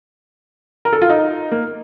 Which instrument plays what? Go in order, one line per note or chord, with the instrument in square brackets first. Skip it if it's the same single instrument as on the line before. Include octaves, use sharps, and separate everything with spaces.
[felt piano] A#4
A4
F4
D#4
A#3